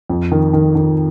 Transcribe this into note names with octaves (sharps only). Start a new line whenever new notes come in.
F2
D#3
D#3
D#3